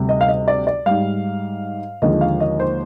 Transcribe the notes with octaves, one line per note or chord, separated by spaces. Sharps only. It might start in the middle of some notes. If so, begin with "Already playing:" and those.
Already playing: D2 C3 G3
D#5
F5
D#5
D5
D5
G#2 G3 F5
D#2 D3 F3 G#3 D#5
F5
D#5
C5